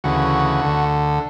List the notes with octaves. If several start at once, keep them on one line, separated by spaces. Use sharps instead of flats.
D2 C#3 E3 F#4
D2 D3